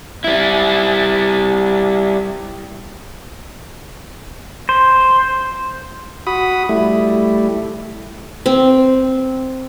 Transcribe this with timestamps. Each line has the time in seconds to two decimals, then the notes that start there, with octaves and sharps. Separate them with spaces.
0.24 G3 E4
4.69 C5
6.27 F#4 B5 D#6
6.69 G3 A3 E4
8.46 C4